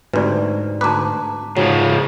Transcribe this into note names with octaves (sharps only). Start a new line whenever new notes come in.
D2 G#2 C3 B4 D5
D2 B4 A5 A#5 D6
G#2 C#3 F3 F#3